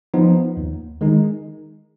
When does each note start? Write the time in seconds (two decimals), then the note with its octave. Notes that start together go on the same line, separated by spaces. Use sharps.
0.14 F3 B3 D#4
0.57 D#2
1.01 D#3 G#3 D#4